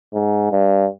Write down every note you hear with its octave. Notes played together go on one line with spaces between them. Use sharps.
G#2
G2